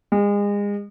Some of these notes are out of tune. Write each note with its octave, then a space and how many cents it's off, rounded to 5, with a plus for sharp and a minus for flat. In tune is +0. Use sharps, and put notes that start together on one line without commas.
G#3 -35